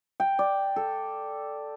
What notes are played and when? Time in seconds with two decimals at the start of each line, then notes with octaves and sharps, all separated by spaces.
0.20 G5
0.39 D5
0.76 A4